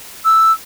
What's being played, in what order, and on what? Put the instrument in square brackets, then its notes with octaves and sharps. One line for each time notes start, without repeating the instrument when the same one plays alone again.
[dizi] E6